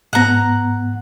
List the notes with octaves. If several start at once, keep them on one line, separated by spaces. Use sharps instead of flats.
G#2 B3 F#5 A#5